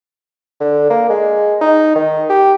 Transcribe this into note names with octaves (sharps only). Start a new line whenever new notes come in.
D3
A#3
G#3
D#4
D#3
G4